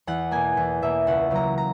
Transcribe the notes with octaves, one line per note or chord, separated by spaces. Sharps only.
E2 F#5
B2 A#3 G#5
E2
B2 A#3 E5
C#2 F#5
C#3 F#3 A#3 A#5
A#5